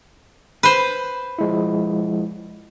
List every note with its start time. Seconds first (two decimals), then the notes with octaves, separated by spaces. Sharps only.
0.63 B4 C5
1.39 F3 G#3 E4